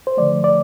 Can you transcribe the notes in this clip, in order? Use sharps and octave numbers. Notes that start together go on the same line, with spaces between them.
C5
D3 F3 A3 D5
D5